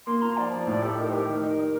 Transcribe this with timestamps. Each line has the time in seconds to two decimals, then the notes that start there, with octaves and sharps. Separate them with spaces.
0.06 A#3 C6
0.22 F4 A#5
0.37 F3 D5
0.52 F3 D5
0.67 A2 D5
0.82 G4 A4
0.98 D#4 A#4
1.09 C5
1.13 G4 A#4
1.29 D#3
1.43 D#4
1.59 D#4